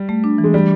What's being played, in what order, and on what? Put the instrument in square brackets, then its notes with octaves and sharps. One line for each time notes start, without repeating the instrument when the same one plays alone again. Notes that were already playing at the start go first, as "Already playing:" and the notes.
Already playing: [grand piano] G3
[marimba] A3
D4
E3
[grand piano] G#3
G3